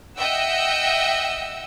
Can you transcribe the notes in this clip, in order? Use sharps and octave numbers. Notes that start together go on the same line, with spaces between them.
D#5 E5 F#5 G5 E6